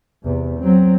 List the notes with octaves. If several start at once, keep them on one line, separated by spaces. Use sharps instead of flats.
E2 C3
F#3 C4